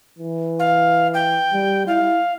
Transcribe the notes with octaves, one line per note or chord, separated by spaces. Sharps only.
E3
F5
G5
G3
E4 F5